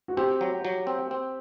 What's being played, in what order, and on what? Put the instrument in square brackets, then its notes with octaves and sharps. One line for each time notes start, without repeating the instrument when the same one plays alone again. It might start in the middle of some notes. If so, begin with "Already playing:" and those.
[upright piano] F#4
[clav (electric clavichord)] C4 [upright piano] G4
[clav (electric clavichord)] F#3
F#3
C4
C4